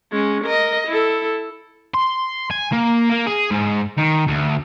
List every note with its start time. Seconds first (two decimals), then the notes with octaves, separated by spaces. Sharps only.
0.12 G#3 C#4
0.44 A#4 D#5
0.88 E4 A4
1.94 C6
2.51 G#5
2.73 A#3
3.10 A#3
3.26 G#4
3.51 G#2
3.98 D#3
4.27 D2